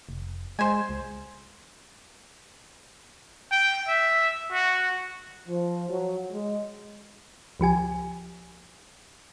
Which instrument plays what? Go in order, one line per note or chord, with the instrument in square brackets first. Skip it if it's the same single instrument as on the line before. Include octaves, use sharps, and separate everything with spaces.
[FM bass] F1
[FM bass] G#3 [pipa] C5 G#5
[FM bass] C#2
[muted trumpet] G5
E5
F#4
[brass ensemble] F3
F#3
G#3
[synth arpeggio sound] C#2 F3 G4 G#5